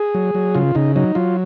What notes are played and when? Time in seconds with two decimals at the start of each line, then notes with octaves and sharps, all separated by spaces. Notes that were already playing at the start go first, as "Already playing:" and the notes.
Already playing: G#4
0.15 F#3
0.35 F#3
0.55 C#3 F4
0.75 C#3 D#4
0.96 F#3 D#4
1.15 F#3 F4